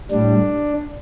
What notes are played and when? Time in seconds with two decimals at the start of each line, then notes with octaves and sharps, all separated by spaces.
0.11 A2 G3 D4